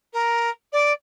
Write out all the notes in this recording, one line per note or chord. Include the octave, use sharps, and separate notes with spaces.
A#4
D5